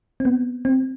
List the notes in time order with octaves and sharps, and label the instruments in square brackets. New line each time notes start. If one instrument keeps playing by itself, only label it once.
[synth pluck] C4
B3
C4